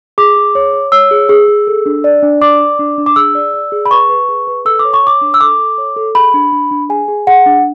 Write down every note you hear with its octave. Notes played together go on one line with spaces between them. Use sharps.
G#4 D6
G#4
C#5
C#5
C#5 E6
G#4
G#4
G#4
A4
D4
D5
D4
D5 D6
D5
D4
D4
D6
G#4 E6
D5
D5
G#4
B5
B4 C#6
B4
G#4
B4
A4 E6
D6
C#5
C#6
C#5 D6
D4
E6
A4 D6
A4
C#5
A4
G#4 B5
D4
D4
D4
G#4 G#5
G#4
G#4 F#5
D4